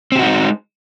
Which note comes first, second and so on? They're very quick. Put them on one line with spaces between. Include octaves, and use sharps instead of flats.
C4 G4 F#4 D#4 G#3